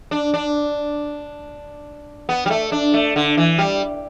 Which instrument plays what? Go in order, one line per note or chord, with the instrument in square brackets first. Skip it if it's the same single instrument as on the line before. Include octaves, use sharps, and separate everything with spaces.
[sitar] D4
D4
B3
G3
A3
D4
A3
D3
E3
G3